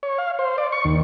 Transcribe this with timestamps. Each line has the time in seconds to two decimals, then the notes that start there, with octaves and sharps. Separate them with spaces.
0.03 C#5
0.18 F5
0.39 C5
0.58 D5
0.72 C#6
0.85 D#2